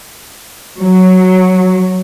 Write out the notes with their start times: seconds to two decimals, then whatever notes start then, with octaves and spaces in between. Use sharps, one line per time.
0.80 F#3